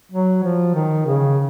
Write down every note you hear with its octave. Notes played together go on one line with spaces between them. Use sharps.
F#3
F3
D#3
C#3